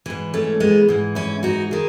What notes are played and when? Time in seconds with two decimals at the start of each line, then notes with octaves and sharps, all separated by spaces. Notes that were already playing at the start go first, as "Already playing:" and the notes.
0.06 G#2 E3
0.34 A3 C#4
0.60 G#3 B3
0.88 G#2 E3
1.15 C#4 E4
1.43 D#4 F#4
1.71 D#3 E4 G#4